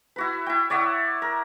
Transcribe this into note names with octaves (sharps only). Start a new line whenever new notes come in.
E4 F#4 B4
E4 G5
C#5 D5 E5 F#5
A#4